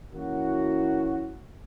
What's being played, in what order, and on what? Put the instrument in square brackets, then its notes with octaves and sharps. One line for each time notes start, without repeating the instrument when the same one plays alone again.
[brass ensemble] E3 A#3 C#4 E4 F#4